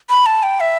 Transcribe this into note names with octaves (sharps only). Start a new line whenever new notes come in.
B5
A5
G5
E5